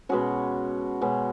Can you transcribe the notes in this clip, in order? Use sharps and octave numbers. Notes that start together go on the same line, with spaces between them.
B2 G#3 C#4 F#4
B2 G#3 C#4